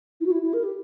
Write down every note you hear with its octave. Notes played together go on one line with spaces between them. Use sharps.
E4
F#4
E4
E4
A#4
G4